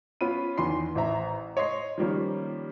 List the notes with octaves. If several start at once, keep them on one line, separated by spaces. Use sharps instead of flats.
B3 C#4 F4 B5 D#7
E2 D#3 B4 C6 C7
A1 C5 E5 A#5
C#5 D#5 C6 C7
D#3 F3 G3 A#3 C#4